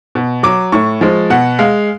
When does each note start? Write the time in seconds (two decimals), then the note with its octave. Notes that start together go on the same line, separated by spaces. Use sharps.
0.15 B2
0.43 F#3 D6
0.72 A2 C#6
1.01 F3 G#3
1.30 B2 F#5
1.59 G#3 F5